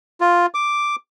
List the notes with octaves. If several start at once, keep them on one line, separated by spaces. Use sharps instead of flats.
F4
D6